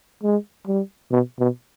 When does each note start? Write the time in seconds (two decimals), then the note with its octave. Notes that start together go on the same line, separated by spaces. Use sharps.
0.23 G#3
0.67 G3
1.11 B2
1.39 B2